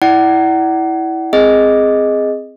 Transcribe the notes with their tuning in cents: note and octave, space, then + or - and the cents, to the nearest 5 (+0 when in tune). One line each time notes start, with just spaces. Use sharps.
E4 -10 D5 +0 F#5 +30
C4 +0 G#4 +0 D#5 +0